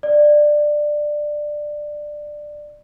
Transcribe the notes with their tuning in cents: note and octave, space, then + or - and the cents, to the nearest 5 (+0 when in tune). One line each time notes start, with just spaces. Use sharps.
D5 +15